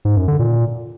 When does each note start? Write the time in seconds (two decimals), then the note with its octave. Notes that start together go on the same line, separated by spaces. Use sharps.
0.05 G#2
0.16 F#2
0.28 D3
0.39 A#2